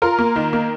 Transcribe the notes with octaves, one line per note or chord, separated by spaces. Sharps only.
F4 A#4
A#3
D#3
A#3